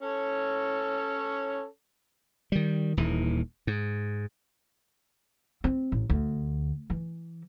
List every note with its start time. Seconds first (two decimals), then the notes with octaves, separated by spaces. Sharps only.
0.02 C#4 A4 C#5
2.52 D#3 G3
2.97 D#1 D#2 E3
3.67 G#2
5.64 C4
5.92 A1
6.10 D2
6.90 E3